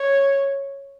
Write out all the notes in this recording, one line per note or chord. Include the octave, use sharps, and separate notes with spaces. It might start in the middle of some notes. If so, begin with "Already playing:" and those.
Already playing: C#5